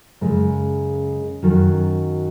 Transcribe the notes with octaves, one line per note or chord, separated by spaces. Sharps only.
F#2 C#3 G#3
F#2 D#3 F#3